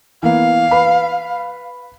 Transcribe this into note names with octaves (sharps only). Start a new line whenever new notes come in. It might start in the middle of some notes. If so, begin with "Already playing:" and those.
E3 A#3 B3 F5
B4 B5